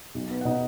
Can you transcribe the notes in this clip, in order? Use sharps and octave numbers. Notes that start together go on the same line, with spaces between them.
B1
B3
F#5
B2 D#4 D#5